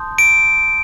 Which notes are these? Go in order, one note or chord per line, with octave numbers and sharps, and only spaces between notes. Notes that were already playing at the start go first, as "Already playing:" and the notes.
Already playing: A5 C6 D#6 G6
D7